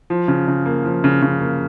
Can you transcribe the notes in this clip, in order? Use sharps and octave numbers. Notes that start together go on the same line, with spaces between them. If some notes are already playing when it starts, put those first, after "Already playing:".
F3
C#3
C#3
A#3
F3
C#3
C#3
A#3